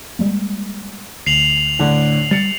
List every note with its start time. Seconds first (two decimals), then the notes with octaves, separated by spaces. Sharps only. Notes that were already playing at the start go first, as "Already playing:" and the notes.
0.19 G3 G#3 A#3
1.26 D2 C7 F7 F#7
1.79 A2 D3 D4
2.31 G3 A6 C#7